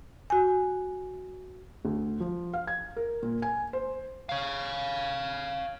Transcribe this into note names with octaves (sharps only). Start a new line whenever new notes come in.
F#4 G#5
D2
F3
F5
G#6
A#4
A#2
G#5
C5
C#5 F5